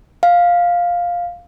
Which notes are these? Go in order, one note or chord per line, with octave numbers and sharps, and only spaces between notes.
F5